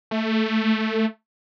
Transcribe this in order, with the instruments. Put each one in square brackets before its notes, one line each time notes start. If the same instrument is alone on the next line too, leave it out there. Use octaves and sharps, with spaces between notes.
[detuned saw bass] A3